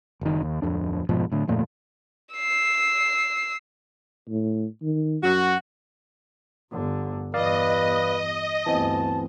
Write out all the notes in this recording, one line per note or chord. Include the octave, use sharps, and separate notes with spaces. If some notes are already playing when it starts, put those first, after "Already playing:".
F#1 D#3
D#2
D1 F2 D4
F1 G#2 B2 F3
A2 D3
D1 F2 A#2 A3
E6 C7
A2
D#3
F#2 F#4
G1 D3
E2 G2 B4 D5 D#5 F5
G1 D2 E3 C4 A5